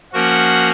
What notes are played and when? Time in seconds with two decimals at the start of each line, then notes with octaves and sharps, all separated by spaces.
0.13 F3 A#3 C#4 F#4 A#4 F#5